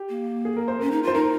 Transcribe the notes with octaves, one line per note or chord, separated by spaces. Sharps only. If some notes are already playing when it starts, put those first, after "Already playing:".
Already playing: G4
A#3
G#4
A#4
C5
C#4 A#4
D#4
F4 C5
D#4 A#4